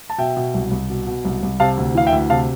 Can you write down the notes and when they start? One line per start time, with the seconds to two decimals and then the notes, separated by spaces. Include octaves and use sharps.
0.10 A5
0.18 B2 E5 G5
0.37 B2
0.54 C2
0.71 C2
0.89 B2
1.07 B2
1.25 C2
1.43 C2
1.60 C3 F5 A5
1.77 D2
1.95 E3 F5
2.07 E5 G5
2.12 D2
2.30 C3 F5 A5